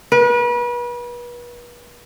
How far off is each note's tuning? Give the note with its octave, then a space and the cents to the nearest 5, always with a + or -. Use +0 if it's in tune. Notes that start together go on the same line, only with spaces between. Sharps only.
B4 -35